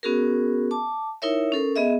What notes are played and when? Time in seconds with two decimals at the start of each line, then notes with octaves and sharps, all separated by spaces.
0.03 B3 C#4 F#4 G#4 A#4
0.71 A5 D6
1.22 D#4 E4 A#4 C#5 E5
1.52 C#4 A4 A#4
1.76 B3 G#4 D#5 E5